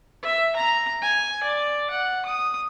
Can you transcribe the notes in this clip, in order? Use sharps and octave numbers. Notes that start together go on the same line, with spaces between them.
E5
A#5
G#5
D5
F#5
D#6